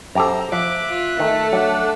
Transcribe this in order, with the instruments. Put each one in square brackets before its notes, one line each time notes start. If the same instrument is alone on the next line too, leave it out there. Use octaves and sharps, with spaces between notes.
[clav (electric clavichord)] F#2 G4 A4 [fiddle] C5 A#5
[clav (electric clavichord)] F3 [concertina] E5 F#6 [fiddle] D6
[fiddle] F4
[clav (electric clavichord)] D#3 [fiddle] A3 A4
[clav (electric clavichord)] F#3 [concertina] D4 F#5